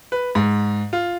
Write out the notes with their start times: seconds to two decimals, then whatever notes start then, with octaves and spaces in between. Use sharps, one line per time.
0.12 B4
0.35 G#2
0.93 F4